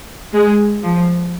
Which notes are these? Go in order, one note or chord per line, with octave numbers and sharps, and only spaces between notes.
G#3
F3